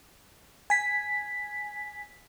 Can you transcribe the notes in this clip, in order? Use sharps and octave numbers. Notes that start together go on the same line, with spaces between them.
G#5 B6